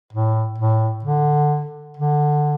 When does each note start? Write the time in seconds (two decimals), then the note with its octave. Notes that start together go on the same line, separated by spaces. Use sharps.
0.13 A2
0.58 A2
1.04 D3
1.97 D3